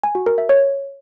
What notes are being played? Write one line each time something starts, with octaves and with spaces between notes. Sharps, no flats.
G#5
F#4
A#4
E5
C#5